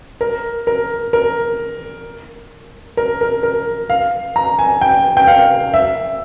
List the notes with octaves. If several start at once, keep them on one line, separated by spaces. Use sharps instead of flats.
A#4
A#4
A#4
A#4
A#4
A#4
F5
A#5
G#5
G5
G5
F5
E5